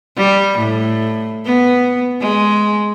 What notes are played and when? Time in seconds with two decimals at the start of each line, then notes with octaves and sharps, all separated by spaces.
0.17 G3
0.58 A2
1.45 B3
2.21 G#3